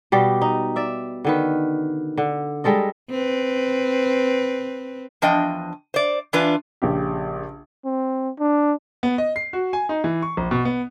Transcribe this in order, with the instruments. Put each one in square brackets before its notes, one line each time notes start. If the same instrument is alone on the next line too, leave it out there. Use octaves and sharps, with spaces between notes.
[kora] B2 G3 G4 D5
D#4
D5 E5
D3 D#3 B4
D3
G3 G#3 A4 D#5
[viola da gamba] C4 B4
[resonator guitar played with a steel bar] E2 F3 D4 D#5 G5
C5 D5
E3 D4 F4 B4
[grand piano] A#1 C#3 G4
[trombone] C4
D4
[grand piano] B3
D#5
C7
F#4
G#5
D#4
E3
C#6
A#1
B2
B3